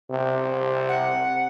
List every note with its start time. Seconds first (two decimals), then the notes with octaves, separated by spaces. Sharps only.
0.10 C3
0.89 F#5